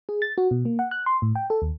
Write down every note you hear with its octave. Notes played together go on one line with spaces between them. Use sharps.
G#4
A6
F#4
B2
A#3
F#5
F#6
C6
A2
G5
A4
D#2